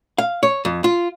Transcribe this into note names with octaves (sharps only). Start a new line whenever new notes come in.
F5
C#5
F2
F4